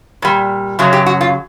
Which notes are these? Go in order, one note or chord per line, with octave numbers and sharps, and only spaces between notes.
A#2 G3
F#2 C#3 F#3
G4
F#4
F4